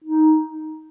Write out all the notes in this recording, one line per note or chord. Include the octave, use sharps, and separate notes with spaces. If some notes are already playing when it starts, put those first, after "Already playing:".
D#4